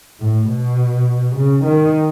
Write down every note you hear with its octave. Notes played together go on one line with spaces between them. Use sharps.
A2
B2
C#3
D#3